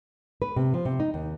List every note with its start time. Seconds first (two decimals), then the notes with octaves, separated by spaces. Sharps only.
0.42 B4
0.56 C3
0.74 F3
0.85 C3
1.00 D#4
1.14 D#2